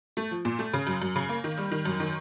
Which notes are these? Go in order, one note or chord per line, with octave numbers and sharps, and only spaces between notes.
A3
F3
A#2
A3
C#3
F#2
F#2
C#3
A#3
D#3
G3
D#3
F#2
D#3